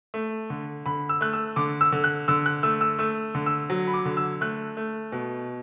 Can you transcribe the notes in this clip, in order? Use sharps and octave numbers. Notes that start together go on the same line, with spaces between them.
A3
D3
D3 B5
E6
A3 F#6
E6
D3 D6
E6
D3
F#6
D3 E6
F#6
A3 E6
E6
A3 E6
D3
E6
F#3
B5
D6
D3
E6
A3 F#6
A3
B2